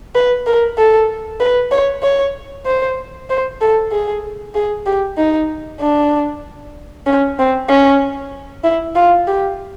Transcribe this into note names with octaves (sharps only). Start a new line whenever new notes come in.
B4
A#4
A4
B4
C#5
C#5
C5
C5
A4
G#4
G#4
G4
D#4
D4
C#4
C4
C#4
E4
F4
G4